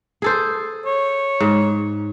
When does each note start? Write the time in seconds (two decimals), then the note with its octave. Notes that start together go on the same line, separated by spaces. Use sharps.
0.22 G#4 A4 C5
0.86 C#5
1.40 G#2